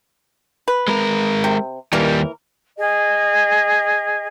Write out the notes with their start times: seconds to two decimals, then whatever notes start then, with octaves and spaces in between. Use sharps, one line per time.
0.68 B4
0.88 G#3 A#4
1.44 C3
1.93 D#2 E3 G3 A#3 A#4
2.78 G#4 D#5